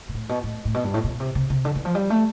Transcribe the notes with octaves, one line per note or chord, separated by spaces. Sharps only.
B2
A2
B2
A2
A2
B2
G2
A2
B2
C3
C3
C3
D3
E3
F3
G3
A3